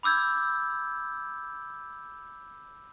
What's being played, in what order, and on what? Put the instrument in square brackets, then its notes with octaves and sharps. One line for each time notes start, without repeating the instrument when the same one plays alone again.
[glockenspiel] B5 D6 E6 G6 G#6